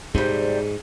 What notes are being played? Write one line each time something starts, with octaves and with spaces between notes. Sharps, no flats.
G#2 C3 G3 D#4 G#4